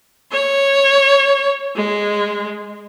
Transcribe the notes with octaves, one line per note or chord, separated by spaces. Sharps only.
C#5
G#3